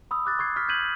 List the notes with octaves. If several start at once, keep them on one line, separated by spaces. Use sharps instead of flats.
B5 D#6 E6
D6 F#6 A6
C#6 G#6 C7
C#6 F6 B6
G6 G#6 B6 D#7 F#7